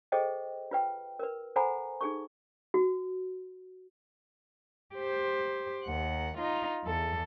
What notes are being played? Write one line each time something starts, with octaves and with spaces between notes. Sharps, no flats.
G#4 A4 C5 D#5 G5
F4 B4 G5
A#4 B4
A4 C5 F#5 G#5 A#5 B5
D#4 G#4 A4 C#6
F#4
G4 C5
D#2 F#5
D#4 F4
E2 A4